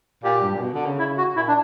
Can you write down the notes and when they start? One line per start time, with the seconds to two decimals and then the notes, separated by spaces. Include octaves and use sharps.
0.24 A#2 G4
0.42 G2
0.55 A#2
0.61 B2
0.74 D3
0.86 C#3
0.99 E4
1.18 F#4
1.36 A#2 E4
1.48 D4